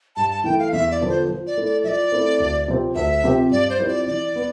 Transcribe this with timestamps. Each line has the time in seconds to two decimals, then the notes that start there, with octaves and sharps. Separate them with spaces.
0.16 G2 A5
0.31 A5
0.44 E3 A3 G5
0.59 F5
0.72 E2 E5
0.91 D5
1.00 D3 F3 B3 F4
1.09 C5
1.28 F3
1.47 D5
1.57 A3 E4 A4
1.65 D5
1.84 F3 D5 E5
2.12 A3 C4 E4 A4
2.40 D2
2.68 C3 F3 C4 G4
2.95 D2 E5
3.24 C3 F3 C4 G4
3.51 G2 D5
3.70 C5
3.79 F3 C4 E4 G4
3.88 D5
4.07 E3 D5
4.36 B3